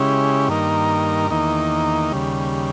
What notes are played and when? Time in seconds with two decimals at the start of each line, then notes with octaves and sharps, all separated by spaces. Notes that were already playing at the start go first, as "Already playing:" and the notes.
Already playing: C#3 G#3 C#4 E4 G4
0.48 G2 D#3 A#3 D#4 A#4
1.30 E2 D#3 A#3 D#4
2.12 D#2 C#3 G3